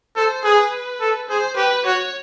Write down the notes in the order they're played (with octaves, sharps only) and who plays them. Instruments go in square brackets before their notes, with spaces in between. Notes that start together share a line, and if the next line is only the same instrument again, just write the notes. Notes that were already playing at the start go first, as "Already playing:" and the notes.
[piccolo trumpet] A4 [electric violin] C5
[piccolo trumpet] G#4 [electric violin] B4
[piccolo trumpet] A4
[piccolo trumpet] G#4 [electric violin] C5
[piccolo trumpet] G4 [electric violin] B4
[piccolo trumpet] F#4 [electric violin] C#5